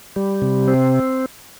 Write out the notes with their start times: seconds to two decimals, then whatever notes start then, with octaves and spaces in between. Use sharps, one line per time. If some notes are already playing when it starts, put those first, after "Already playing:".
0.16 G3
0.42 C3
0.68 C4